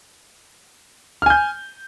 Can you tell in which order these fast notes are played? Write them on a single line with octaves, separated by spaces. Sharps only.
F6 G#5 G6